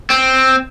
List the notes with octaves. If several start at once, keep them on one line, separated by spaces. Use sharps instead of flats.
C4